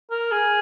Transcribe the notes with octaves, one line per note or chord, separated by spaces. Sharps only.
A#4
G#4